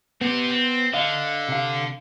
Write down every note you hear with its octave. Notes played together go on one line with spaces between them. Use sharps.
B3 C4 G4
C4
D3 D#5 F5
C3 F5